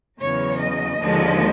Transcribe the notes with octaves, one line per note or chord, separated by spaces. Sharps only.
E2 C#3 F#3 C#5
D#5
D#2 D3 F3 G#3